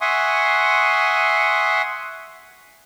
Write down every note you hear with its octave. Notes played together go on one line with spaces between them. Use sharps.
E5 F#5 G#5 C6 C#6 D#6